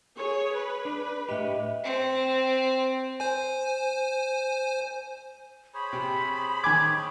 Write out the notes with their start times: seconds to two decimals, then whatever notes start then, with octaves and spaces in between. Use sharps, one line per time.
0.16 G#4 C#5
0.54 B4
0.85 D4
1.29 A2 G4 D#5 E5
1.83 C4
3.20 C5 G#5
5.74 G#4 C5 C#5 B5
5.93 C3
6.64 D#3 G#5 D6 G#6